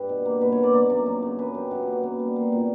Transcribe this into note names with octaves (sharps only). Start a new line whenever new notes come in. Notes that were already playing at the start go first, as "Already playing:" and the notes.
Already playing: G2 G4 B4
B2
A#3
B2 B4
C#5
A#3
D5
A#3 D5
F#2
F#2
C#3
F#2 B4
F#2 G4
F#2 F#4
A#3 C#4
B3
A#3 B3
G3
A#3
A#2